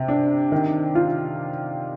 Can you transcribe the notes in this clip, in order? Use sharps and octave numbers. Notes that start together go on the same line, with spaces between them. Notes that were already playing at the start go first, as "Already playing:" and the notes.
Already playing: C3
D4
D#3
F4